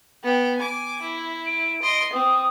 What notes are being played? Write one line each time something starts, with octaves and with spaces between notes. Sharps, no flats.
B3 G5
G#5 D6
E4
D7
D#5 C6
C4 D#6